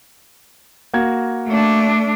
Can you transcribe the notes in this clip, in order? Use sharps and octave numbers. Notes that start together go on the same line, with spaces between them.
A#3 F#4 G#6
A3 D4